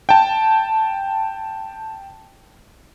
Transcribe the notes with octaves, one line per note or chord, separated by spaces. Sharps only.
G5 A5